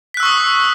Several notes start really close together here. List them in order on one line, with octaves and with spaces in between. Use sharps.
B6 F#6 E6 C#6 D#6